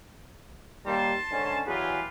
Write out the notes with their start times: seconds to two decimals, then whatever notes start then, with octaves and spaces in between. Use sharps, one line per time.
0.86 D#2 G3 A#3 A5 C6
1.31 G#2 D3 C#4
1.67 E2 F#3 F4 G4 G#4 B4